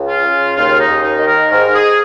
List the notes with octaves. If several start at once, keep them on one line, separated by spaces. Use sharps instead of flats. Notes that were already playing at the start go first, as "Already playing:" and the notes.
Already playing: C#2
F4
C#3
D#2 F4
D#4
D#2
D#4
D#3
A#4
G#2 A#4
G#4